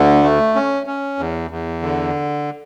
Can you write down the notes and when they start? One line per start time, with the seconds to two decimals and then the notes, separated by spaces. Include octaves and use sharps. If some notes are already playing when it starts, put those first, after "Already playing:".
Already playing: D2 D3
0.23 A3
0.55 C#4
0.87 C#4
1.19 E2
1.51 E2
1.82 D3